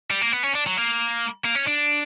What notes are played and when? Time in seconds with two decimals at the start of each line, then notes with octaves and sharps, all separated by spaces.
0.11 G3
0.22 A#3
0.33 B3
0.43 C#4
0.55 D4
0.67 F#3
0.77 A#3
1.45 A#3
1.56 C#4
1.68 D4